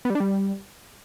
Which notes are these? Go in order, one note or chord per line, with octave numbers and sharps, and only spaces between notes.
B3
G3
D4
G3